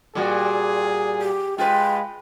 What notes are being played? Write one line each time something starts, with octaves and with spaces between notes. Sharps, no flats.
A#2 G3 F#4 G#4
G4
G#3 F4 B4 G5